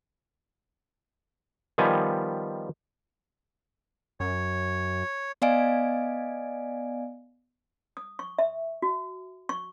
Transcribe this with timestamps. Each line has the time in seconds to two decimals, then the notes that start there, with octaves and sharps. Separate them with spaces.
1.78 D#3 F3 G3 B3 G#5
4.20 F#2 C#5
5.42 B3 D5 D#5 F5 G#5 D7
7.97 D#6
8.19 C#6
8.39 E5
8.82 F#4
9.49 C#6